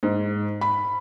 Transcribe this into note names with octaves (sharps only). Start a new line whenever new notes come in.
G#2
B5